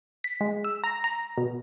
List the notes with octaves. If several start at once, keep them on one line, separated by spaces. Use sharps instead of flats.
B6
G#3
E6
A#5
A#5
B2